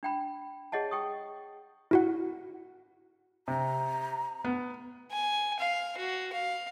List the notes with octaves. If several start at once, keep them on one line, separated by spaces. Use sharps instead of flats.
D4 G5 B5
G#4 C#5 D#5 F#5 A5
G#4 G5 C#6 D#6
E4 F#4 F#5
C3 A#5
B3
G#5
F5
F#4
F5